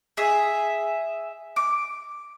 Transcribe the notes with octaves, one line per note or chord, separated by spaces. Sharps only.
G#4 E5
D6